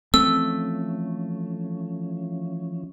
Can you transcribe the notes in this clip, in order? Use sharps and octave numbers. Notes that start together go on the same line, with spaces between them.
E3 F3 A3 C4 C#4 E6